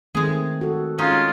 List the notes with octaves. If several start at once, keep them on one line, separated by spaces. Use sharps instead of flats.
D#3 G#3 A3 C4 G#4
F#4 A4
G#3 C#4 D#4 F4